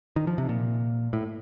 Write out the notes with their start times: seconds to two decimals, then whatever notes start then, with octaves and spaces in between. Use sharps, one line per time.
0.16 D#3
0.27 F3
0.38 C3
0.49 A#2
1.13 A2